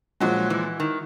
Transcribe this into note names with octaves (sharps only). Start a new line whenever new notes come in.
A#2 F3 F#3 G#3
E3
D#3